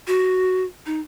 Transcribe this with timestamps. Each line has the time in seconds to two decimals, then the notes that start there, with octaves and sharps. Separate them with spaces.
0.07 F#4
0.86 D#4